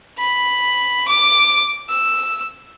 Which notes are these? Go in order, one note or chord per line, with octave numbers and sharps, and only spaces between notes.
B5
D6
E6